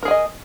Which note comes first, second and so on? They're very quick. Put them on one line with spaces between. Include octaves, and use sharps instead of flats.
A#4 G#4 G#5 D#5